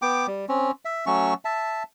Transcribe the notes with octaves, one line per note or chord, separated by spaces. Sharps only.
B3 G5 D6
G3
C4 C#4
E5
F#3 A3 C#4 C#6
E5 A5